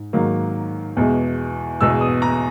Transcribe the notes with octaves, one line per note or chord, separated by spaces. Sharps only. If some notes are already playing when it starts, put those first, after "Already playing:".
Already playing: G#2
G#2 D#3 F#3 A#3
E2 B2 G#3
E2 B2 G#3 E6
D#6
A#5